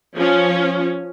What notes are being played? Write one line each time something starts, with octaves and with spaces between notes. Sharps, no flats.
F3 C#4